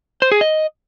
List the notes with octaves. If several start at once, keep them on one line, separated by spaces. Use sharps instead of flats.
C5
G#4
D#5